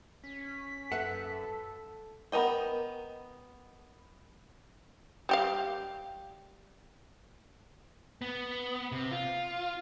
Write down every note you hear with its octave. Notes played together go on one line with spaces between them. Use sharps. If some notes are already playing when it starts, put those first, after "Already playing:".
C#4 B6
F#2 A4 B4 E5 F#5
B3 A#4 D#5 G5
G3 G4 F5
B3
C3
F4